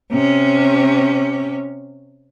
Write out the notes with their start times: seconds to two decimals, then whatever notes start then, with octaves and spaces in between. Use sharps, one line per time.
0.12 C3 C#4